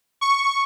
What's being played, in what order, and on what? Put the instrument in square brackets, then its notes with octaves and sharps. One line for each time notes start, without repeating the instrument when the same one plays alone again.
[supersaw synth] C#6